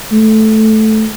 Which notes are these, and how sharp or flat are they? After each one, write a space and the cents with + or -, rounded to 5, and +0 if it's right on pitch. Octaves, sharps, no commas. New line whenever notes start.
A3 -10